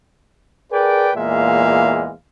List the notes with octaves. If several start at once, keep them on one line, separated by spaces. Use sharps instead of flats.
G#4 A#4 B4 D5 G5
E2 A#2 G#3 A#3 E5 F5